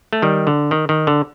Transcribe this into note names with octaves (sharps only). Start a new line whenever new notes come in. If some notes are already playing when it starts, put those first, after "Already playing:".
A3
D#3 G3
D3
D#3
D#3
D3